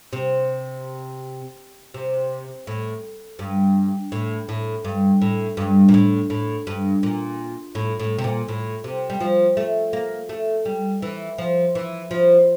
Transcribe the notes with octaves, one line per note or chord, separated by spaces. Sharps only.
C3
C3
A2
G2
A2
A2
G2
A2
G2
A#2
A2
A2
G2
A#2
A2
A2
C3
A#2
A2
C3
G3
F3
A3
A#3
A3
G3
E3
F3
E3
F3